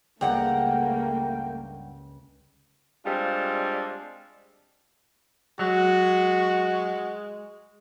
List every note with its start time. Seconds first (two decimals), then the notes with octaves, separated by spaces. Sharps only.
0.21 C#2 G2 A3 A#3 F#5 G5 A#5
3.06 G3 G#3 C4 D4 F4
5.59 F#3 G#3 F#4